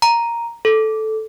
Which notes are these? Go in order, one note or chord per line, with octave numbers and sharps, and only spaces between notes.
A#5
A4